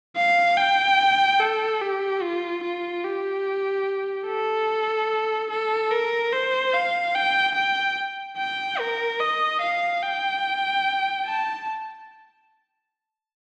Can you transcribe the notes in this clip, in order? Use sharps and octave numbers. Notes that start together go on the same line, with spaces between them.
F5
G5
A4
G4
F4
F4
G4
A4
A4
A#4
C5
F5
G5
G5
G5
A#4
D#5
F5
G5
A5